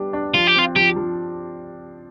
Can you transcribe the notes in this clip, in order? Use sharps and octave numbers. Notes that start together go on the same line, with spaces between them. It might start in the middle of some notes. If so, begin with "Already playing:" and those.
Already playing: G3 B3 D4 G4
D4
F3 F4
G4
C4 F4
F3 G4
F3